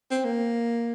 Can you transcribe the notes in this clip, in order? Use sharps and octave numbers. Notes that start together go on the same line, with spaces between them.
C4
A#3